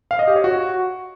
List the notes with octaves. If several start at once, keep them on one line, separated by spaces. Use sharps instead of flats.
F5
D#5
G4
C#5
F#4